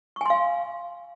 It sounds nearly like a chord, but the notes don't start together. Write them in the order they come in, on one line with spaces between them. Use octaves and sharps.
C#6 G#5 C6 F5